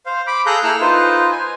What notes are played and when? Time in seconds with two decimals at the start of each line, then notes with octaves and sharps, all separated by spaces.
0.06 C5 F5
0.27 B5 D6
0.46 G#4 A4 F5 A#5 F#6 G6
0.63 A#3 E4 A4 E6 F6
0.81 D#4 F4 B4 C5
1.31 G#5